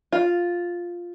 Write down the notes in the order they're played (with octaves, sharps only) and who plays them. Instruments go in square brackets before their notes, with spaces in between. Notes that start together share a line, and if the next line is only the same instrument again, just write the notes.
[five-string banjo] F4